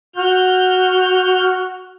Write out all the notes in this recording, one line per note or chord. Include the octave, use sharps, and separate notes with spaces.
F#4 F6 G6